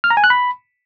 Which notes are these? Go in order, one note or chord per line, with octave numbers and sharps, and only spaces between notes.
F6
A#5
G#5
F#6
B5